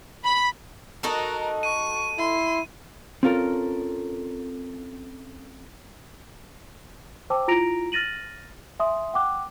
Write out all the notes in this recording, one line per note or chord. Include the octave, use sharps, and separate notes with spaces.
B5
D#4 F#4 A4 A#4
C#6 D#7
E4 C6
C4 C#4 F4 A4 A#4
C5 G5 A5 D6 E6
E4 F4 A#5 A#6 D7 F7
F6 A6 A#6 D#7 F#7
E5 G#5 C6 D#6
F#5 G5 D6 F#6